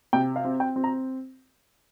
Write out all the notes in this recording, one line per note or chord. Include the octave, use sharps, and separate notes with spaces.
C3 G5
F5
C4
G5
C4
A#5